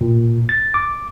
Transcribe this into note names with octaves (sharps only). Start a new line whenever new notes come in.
A#2
A6
D6